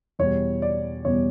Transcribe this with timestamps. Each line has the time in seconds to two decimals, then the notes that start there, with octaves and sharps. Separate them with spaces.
0.19 E2 B2 G3 C#5
0.62 D5
1.05 E2 B2 G3 C#5